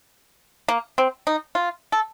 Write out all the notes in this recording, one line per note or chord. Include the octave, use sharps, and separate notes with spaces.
A#3
C4
D#4
F4
A4